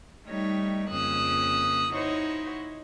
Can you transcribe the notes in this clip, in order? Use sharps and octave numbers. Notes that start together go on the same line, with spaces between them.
G3 A3 D#4 C#5 G5
F2 C#3 A#3 D#6 E6 F#6
D#4 E4 F#4 C5 C#5